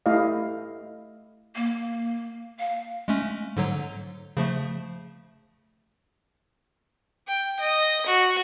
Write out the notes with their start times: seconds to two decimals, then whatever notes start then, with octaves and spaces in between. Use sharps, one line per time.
0.06 A3 E4 G4 D#5 F5
1.56 A#3
2.59 F5
3.08 G#3 A3 C#4
3.57 G#2 D3 F#3
4.37 C#3 F3 A3
7.27 G5
7.60 D#5
8.06 F#4